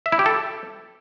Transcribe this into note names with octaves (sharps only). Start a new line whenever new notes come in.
E5
E4
G4
A4